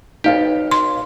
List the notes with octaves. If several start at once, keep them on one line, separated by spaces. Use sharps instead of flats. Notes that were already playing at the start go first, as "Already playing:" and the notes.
B1 F2 D#4 G4 F5
C6